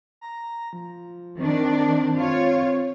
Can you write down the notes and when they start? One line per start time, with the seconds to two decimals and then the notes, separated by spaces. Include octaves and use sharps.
0.21 A#5
0.73 F3
1.39 D#3 C4 D4
2.18 F4 C#5